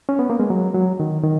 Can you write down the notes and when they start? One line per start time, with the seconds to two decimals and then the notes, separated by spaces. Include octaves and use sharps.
0.09 C#4
0.19 B3
0.30 A#3
0.40 G#3
0.50 F#3
0.74 F#3
1.00 D#3
1.24 D#3